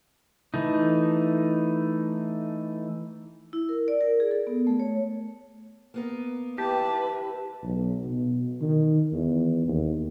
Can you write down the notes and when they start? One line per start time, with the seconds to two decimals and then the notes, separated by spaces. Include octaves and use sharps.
0.54 E3 A3 D#4
3.53 E4
3.69 A#4
3.88 D5
4.01 A#4
4.20 G#4
4.31 A4
4.47 B3
4.67 A3
4.80 C#5
5.94 A#3 B3 A#4
6.58 E4 G4 B4 A5
7.63 B1
8.05 B2
8.61 D#3
9.12 E2
9.68 D#2